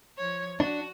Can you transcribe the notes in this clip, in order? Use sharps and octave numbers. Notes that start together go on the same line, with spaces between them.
F3 C#5
D4 F#4